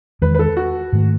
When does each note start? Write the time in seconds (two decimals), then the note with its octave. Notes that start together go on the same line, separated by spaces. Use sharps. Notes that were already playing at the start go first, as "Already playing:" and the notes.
0.22 E2 D#3 G#3 B4
0.34 B4
0.39 A4
0.57 F#4
0.92 G#2 D#3 A3